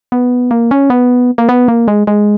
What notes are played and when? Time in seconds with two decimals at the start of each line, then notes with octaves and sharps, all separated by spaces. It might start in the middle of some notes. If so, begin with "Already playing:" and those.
0.12 B3
0.51 A#3
0.71 C#4
0.90 B3
1.38 A#3
1.49 B3
1.68 A#3
1.88 G#3
2.07 G#3